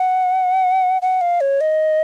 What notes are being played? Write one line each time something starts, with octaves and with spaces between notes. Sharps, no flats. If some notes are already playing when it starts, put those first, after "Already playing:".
Already playing: F#5
F#5
F5
C#5
D#5